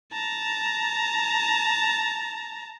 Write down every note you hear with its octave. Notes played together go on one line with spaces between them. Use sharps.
A5 A#5